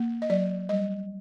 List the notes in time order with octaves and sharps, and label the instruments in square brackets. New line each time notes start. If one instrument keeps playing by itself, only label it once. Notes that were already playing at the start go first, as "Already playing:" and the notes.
Already playing: [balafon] A#3
D#5
F#3 D5
G3 D#5